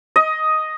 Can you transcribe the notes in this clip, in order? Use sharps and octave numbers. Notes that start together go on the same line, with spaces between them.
D#5